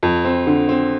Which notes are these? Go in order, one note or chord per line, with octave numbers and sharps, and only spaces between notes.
F2
C4
D3
C4